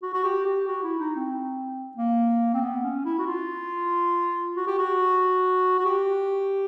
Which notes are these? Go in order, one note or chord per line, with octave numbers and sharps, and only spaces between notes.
F#4
F#4
G4
G4
F#4
E4
D#4
C4
A#3
C4
B3
C#4
E4
F#4
F4
F#4
G4
F#4
F#4
G4